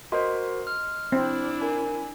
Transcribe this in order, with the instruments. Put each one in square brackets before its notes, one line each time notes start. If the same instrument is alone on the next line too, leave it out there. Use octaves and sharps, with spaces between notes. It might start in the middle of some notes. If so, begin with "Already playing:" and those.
[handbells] F#4 A#4 C5 [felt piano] D#5 C6
[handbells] F6
[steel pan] C4 [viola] D4 E4
[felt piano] A#4 [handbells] G#5